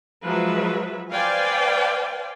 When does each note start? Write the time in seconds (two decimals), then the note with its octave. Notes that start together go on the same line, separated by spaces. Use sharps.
0.25 F3 F#3 G#3 B4 E5
1.10 B4 C5 D5 F5 G5 G#5